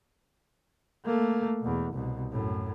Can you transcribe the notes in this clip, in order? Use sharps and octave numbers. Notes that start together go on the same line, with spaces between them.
A3 A#3
E2 B2
C2 B2
F#2 A2